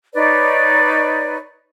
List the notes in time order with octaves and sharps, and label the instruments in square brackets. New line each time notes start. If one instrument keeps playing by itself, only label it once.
[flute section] D#4 B4 C#5 D5